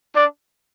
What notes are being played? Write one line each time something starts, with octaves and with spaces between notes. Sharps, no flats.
D4